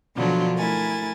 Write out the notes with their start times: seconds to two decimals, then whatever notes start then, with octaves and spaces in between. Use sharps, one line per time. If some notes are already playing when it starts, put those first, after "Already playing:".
0.17 B2 D3 F3 F#3 D4 F4
0.57 A3 E4 A#4 G#5 A6